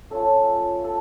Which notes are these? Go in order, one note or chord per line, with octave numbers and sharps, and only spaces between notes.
A3 C#4 F4 A4
A4